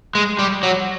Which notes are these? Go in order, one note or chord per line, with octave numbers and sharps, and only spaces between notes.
G#3
G3
F#3